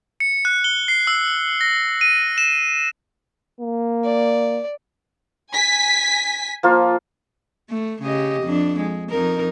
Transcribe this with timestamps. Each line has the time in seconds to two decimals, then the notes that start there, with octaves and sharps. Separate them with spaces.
0.20 C#7
0.45 F#6
0.64 G7
0.88 C7
1.07 E6
1.61 A#6
2.01 D#7
2.38 E7
3.60 A#3
4.04 D5
5.52 G#5 B6
6.63 F3 A#3 F4
7.70 A3
8.02 C#3 G4 D#5
8.43 F2 D4
8.80 G#3
9.10 F2 D#4 A#4